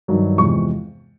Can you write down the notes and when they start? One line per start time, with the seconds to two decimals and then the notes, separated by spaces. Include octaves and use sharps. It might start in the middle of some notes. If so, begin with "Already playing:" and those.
0.08 G2 D#3 F#3
0.38 E2 C3 F3 G#3 C#6